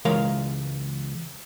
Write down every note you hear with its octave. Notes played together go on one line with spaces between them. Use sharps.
C#2 E3 G#3 A#4 C#5 F5